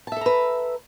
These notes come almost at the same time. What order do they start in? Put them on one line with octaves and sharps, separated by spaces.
A5 E5 A4 A#5 B4